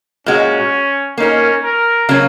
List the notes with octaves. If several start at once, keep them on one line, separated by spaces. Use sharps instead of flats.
A#2 G#3 C#4 F#4
A#3 C#4 D#4 A#4
A#4
C#3 F#3 A#3 C#4